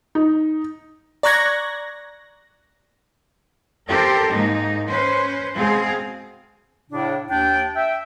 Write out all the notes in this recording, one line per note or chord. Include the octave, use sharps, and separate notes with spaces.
D#4
D5 A#5 C#6 F#6 G#6 A#6
C4 G4 A4 A#4 C5
G#2 A#3 D#4
C#4 B4 C5
B2 G#3 C4 G#4 F5
A2 C#3 D4
D#2 D4 G5
E5 G5